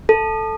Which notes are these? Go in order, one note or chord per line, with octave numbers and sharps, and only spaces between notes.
A4